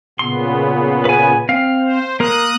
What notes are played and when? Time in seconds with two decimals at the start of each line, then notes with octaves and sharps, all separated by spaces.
0.19 A#2 C#3 B3 C6
1.05 B4 G#5
1.49 C4 F5
1.81 C5
2.20 A#3 A#4 D#6 F#6